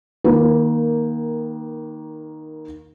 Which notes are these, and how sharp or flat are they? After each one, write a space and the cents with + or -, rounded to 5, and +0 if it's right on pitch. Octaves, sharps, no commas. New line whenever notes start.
D#3 +0 A#3 +10 B4 -25